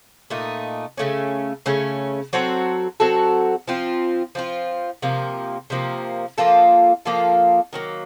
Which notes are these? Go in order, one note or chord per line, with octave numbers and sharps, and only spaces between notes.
A#2 A3 D#4
C#3 A3 C#4
C#3 A3 C#4
F#3 C4 F#4 A4
F#3 C4 F#4 A4
F3 C4 F4
F3 C4 F4
C3 F3 A#3
C3 F3 A#3
F3 A#3 F4 A4
F3 A#3 F4 A4
D#3 F#3 A#3